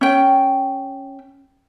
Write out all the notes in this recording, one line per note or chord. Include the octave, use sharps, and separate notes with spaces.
C#4 G5